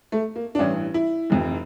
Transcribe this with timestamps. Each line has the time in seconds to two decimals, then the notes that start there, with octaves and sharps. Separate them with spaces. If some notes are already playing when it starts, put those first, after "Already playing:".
0.12 A3
0.36 A#3
0.55 D4
0.59 A1 G2 E3 C#4
0.94 E4
1.30 F1 F2 E3